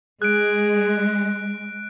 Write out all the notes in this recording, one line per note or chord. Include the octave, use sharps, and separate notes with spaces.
G#3 G#4 F#6 D7